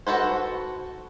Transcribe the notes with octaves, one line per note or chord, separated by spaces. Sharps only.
F#4 A4 B4 C5